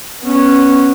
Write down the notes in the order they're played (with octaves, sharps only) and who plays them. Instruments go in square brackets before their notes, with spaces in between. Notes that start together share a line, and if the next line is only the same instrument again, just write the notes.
[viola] B3 C#4